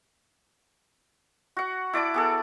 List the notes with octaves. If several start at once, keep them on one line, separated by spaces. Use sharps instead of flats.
F#4 F#5
E4 D5 A5 D6
B3 G#4 A4